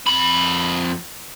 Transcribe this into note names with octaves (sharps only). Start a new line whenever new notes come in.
F2 B5